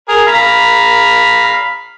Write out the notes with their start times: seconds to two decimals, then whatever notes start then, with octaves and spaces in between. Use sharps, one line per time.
0.09 G#4 A#4
0.28 F5 A#5 B5